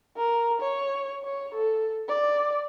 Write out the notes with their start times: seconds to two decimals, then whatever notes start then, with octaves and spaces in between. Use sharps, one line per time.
0.17 A#4
0.60 C#5
1.24 C#5
1.54 A4
2.08 D5